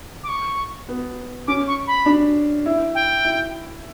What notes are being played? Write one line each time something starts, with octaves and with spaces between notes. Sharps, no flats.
D6
C#6
B3
C#4 D6
C#6
B5
D4
E4
G5
E4